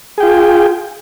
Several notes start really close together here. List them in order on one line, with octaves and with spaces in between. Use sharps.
G#4 G5 F4